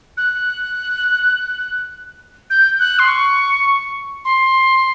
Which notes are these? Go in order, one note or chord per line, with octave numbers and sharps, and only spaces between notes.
F#6
G6
F#6
C6
C#6
C6